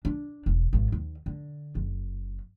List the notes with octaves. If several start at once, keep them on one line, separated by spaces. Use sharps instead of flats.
D4
E1
G#1 D#3
D#2
D3
F#1